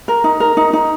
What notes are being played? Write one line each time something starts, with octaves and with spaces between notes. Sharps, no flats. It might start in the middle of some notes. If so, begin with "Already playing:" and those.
A#4
D#4
A#4
D#4
D#4